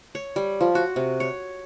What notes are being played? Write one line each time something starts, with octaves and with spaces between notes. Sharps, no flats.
C#5
G3
F3
F#4
C3
C#5